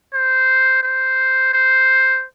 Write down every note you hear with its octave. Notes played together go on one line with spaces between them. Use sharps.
C5
C5
C5